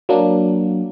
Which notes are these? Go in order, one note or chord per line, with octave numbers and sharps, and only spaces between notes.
F#3 A#3 D4